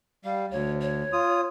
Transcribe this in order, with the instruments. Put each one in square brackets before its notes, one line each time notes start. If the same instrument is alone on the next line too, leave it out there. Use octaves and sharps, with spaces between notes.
[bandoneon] G3 [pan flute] F5
[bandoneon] D2 [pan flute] C#5
[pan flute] C#5
[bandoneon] F4 D#6